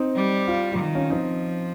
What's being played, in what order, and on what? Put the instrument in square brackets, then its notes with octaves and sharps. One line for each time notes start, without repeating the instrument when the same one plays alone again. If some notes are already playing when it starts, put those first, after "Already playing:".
Already playing: [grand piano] C4 D#4
[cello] G3
[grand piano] F4
F4
[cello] D#3
[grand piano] C#4 F4
[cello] F3 [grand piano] C4 D#4